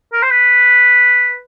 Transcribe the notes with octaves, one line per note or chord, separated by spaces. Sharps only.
A#4
C5
B4